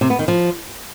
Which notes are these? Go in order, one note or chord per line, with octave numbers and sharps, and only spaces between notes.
C3
B3
D#3
F3